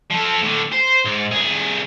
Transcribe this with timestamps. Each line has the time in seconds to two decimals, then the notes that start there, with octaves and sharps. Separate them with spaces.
0.11 F3 A4
0.43 A2 D3
0.73 C5
1.05 G#2
1.32 C2 G#4